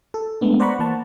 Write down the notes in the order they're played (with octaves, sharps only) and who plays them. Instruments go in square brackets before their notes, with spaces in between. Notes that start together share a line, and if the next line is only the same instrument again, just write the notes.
[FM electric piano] A4
G#3 A3 B3 D4
C5 D5 F#5 A#5 B5 C#6
E3 A#3 F#5 A5